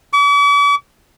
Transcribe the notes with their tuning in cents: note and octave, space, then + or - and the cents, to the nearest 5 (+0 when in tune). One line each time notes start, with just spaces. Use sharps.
D6 -45